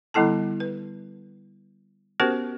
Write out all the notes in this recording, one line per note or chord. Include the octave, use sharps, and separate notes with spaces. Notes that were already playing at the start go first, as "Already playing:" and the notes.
D3 G3 B3 E4 A4 A5
B4
B3 C#4 F#4 G4 A#4 C5